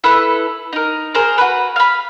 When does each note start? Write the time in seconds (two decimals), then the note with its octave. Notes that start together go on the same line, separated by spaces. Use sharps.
0.04 E4 A4 B4
0.73 D#4 A#4
1.15 G#4 A#4 C5
1.38 F#4 B4
1.76 F5 B5